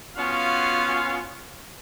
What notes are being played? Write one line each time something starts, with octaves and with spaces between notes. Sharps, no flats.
B3 C#4 F4 F#4 F5